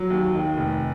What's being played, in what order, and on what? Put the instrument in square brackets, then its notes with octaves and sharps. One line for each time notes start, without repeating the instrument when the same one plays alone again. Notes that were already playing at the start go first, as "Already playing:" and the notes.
Already playing: [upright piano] F#3
D#2
D#3
F1